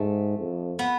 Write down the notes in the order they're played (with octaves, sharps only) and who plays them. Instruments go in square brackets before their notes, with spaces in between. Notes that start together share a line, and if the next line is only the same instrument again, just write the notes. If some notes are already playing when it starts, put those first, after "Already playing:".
Already playing: [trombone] G#2 [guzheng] A3
[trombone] F2
[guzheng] B3